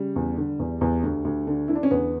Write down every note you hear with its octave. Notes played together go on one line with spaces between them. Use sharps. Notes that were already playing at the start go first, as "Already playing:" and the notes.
Already playing: C#3 G3
E2
D3
E2
E2
D2
D2
D3
D3 E4
D4
C#4
E2 B3